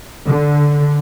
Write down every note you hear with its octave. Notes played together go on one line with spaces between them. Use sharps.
D3